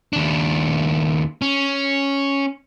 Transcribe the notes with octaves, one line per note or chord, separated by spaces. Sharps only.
D#2 D4
C#4